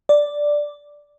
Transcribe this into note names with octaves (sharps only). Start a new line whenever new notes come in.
D5